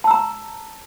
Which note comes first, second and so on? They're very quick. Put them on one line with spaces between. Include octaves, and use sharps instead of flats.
A5 E6 A#5